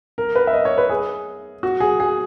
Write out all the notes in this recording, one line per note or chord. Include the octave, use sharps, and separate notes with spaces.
A#4
B4
E5
D#5
C#5
B4
G#4
F#4
G#4
G#4